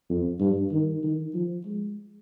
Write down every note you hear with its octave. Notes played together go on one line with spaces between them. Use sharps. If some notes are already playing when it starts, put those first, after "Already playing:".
F2
G2
D#3
D#3
F3
G#3